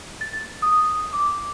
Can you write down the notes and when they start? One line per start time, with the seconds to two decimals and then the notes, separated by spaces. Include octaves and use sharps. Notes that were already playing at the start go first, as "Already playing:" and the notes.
0.21 A6
0.62 D#6
1.13 D6